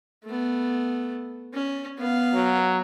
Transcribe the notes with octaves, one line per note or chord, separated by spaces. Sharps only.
A3 B3
C#4
B3 F5
F#3